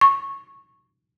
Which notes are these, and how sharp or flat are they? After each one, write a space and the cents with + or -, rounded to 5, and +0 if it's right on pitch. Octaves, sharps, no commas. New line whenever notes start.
C#6 -15